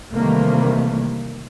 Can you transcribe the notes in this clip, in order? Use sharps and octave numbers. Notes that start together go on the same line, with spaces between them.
C3 D#3 E3 G3 A3 A#3